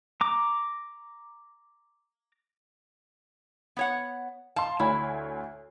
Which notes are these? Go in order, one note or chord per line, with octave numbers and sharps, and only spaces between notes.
A#5 D6
B3 C#5 F#5
F5 A5 C6
D2 E4 C#5 G#5